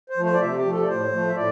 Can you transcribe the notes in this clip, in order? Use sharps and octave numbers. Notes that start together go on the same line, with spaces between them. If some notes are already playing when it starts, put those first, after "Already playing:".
C5
F3 A3
C5
D5
C3 E5
G4
F3 A3
A4
D5
A2 C5
F3 A3
E5
A2 D5